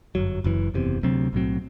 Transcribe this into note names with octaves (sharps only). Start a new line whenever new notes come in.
G1 F#2 F#3
F#1 F#2 E3
F#1 E2 C3
D2 C3 F#3 C4
B1 A2 F#3 C4